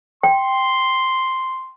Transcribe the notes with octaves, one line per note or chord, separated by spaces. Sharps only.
G5 C6